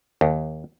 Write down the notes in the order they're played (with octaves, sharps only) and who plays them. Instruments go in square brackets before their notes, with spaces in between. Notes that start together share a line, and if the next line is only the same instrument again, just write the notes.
[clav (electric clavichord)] D#2